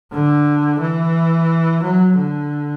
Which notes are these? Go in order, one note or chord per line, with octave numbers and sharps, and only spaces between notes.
D3
E3
F#3
D3